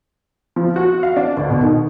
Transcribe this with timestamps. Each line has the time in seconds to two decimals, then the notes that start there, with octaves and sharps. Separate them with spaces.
0.56 F3
0.76 F#4
1.03 F5
1.16 D4
1.37 D2
1.50 B2
1.62 D#3